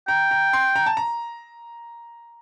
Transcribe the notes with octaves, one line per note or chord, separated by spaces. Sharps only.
G5 A#5
A#5
C6
A#5
A5
A#5